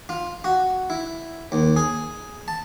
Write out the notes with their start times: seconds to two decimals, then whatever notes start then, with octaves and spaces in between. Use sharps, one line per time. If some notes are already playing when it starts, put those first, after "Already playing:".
0.09 F4
0.44 F#4
0.90 E4
1.52 D#2
1.76 G#4
2.48 A5